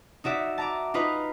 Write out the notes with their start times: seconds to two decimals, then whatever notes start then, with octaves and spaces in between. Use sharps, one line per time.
0.24 D#4 F#4 D5 E5
0.58 A5 A#5 D6
0.94 D#4 F4 B4 D#5 A#5